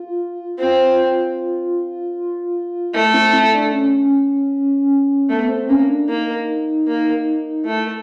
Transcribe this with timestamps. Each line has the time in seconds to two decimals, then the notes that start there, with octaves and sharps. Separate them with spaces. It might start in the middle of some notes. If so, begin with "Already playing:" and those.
Already playing: F4
0.59 C4 F4
2.94 A3 E4
3.14 C4
3.33 E4
3.54 D4
3.72 C#4
5.29 A3 B3
5.49 C4
5.69 A#3 C#4
5.89 D4
6.08 A#3 D#4
6.87 A#3
7.65 A3 E4